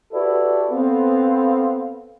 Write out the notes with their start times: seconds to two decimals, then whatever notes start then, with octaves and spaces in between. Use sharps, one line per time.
0.13 E4 F#4 G4 A4 B4 D5
0.71 B3 C4 A4 F5